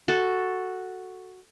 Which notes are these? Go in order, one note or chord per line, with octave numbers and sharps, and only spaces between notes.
F#4 A4